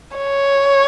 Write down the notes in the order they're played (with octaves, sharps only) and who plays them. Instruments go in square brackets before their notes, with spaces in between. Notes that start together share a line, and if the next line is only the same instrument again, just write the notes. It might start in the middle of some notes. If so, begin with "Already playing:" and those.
[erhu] C#5